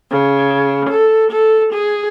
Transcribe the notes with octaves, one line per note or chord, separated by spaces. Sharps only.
C#3
A4
A4
G#4